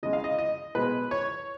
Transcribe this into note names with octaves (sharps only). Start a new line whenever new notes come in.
C#3 G#3 D#5
F5
D#5
D#5
B2 G#3 B4
C#5